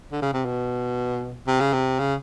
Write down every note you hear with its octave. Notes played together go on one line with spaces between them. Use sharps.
D3
C#3
C3
B2
C3
C#3
C3
C#3